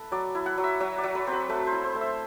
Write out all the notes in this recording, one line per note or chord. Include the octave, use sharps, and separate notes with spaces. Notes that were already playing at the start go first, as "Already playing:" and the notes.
Already playing: E4 A4 B4
F#3 D5
E4
F#5
F#3
E5
F#3 E5
D5
F#3
B4
C4
B4
A3 B4
C5
E4
C5
A3
E5